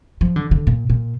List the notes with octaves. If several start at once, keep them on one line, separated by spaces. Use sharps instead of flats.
F3
D3
D3
A#2
A#2